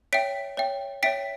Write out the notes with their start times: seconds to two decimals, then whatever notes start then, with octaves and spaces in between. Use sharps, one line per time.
0.13 C#5 E5 G5 B6 D7
0.57 C#5 E5 G5
1.03 C#5 E5 G5 B6 D7